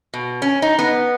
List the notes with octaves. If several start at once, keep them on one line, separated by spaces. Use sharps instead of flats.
B2
C#4
D#4
B3